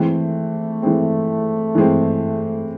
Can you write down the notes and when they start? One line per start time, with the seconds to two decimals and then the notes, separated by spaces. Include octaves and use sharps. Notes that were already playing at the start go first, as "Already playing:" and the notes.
Already playing: E3 G#3 A3 C4
0.82 E3 G#3 C4
1.75 E3 G#3 C4